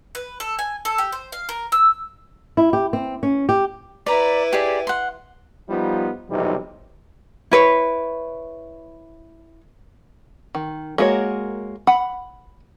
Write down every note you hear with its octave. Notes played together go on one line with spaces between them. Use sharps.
B4
A4
G#5
A4
G4
C5
F5
A#4
E6
E4
G4
C4
C#4
G4
E4 B4 D5 A#5
G4 G#4 D5
F#5 C6
F3 G3 B3 D#4 F4
B1 F2 C3 E3 G3 D#4
E4 B4 C#5
D#3
G#3 A#3 F#4 A#4 C#5
F#5 B5